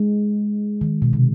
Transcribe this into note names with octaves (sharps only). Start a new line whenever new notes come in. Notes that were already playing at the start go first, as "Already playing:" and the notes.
Already playing: G#3
D#3
B2
C3